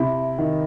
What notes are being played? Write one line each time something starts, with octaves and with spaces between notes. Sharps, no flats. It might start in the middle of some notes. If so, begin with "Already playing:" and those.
Already playing: C3 E4
D#3